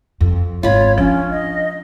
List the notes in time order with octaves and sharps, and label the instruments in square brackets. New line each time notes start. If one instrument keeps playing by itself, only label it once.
[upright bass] F2
[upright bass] G#1 [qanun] F4 B5 [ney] C#5
[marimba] F3 [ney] C#4 [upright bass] D4
[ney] D#5